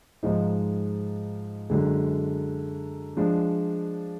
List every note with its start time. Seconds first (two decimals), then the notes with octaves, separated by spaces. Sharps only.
0.23 G#2 F3 G#3 D#4
1.70 F#2 D3 G#3
3.17 F3 G#3 D4